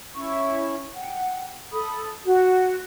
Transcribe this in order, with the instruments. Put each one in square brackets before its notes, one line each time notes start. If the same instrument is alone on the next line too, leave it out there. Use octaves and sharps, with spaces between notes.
[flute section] C#4 E4 C#6
F#5 G5
A4 B5 D#6
F#4